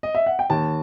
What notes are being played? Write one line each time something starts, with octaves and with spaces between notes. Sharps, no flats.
D#5
E5
F#5
G5
D#2 A5